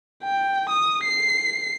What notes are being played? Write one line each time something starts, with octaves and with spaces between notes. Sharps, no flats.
G5
D#6
C7